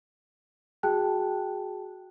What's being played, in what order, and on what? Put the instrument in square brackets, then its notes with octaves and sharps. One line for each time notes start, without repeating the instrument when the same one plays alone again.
[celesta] F#4 G#4 G5 A5 F#6